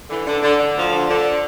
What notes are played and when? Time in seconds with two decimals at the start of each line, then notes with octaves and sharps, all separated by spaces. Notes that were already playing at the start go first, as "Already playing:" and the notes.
0.10 D3 E3
0.26 D3
0.42 D3
0.58 D3
0.76 D2 F3
0.91 D3
1.09 D3